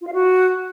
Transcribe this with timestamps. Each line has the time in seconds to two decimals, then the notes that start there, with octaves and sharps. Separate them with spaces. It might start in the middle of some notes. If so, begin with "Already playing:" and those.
0.01 F4
0.07 F5
0.13 F#4